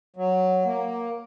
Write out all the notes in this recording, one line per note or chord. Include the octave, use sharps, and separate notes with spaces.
F#3
A#3